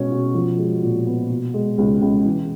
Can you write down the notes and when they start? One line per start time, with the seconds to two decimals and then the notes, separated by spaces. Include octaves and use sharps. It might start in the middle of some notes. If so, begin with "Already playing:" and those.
Already playing: B2 G#3 C#4
0.11 B2
0.35 F3
0.58 G#3
0.83 A#2
1.07 B3
1.30 B2
1.54 G#3
1.78 C#2
2.02 C#2
2.25 E3